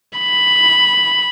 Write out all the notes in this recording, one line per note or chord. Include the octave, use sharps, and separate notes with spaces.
B5